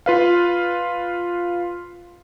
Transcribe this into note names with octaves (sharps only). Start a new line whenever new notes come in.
F4 B4 F5